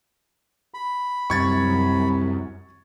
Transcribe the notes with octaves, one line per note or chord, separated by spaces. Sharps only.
B5
C2 F#2 C#6 G#6 A6